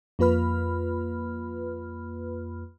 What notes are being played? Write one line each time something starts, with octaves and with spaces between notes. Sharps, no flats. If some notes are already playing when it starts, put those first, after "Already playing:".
F2 A#3 F4 B4 B5 F6